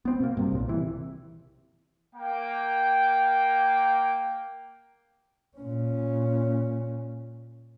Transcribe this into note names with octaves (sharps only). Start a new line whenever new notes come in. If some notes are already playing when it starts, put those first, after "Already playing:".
B3 C4
B2 A#3
G2 C3
B1 A#2
C3 E3
A#3 G5
A#2 C#4